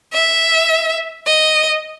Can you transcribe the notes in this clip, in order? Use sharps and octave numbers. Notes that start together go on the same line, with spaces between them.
E5
D#5